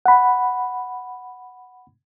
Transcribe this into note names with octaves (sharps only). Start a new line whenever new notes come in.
F#5 B5